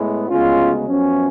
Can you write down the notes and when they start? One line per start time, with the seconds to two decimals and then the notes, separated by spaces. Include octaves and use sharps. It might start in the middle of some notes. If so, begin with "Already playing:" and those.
Already playing: A2 G#3 B3
0.30 D2 C#3 G#3 B3 C#4 F4
0.88 F#2 F3 B3 C#4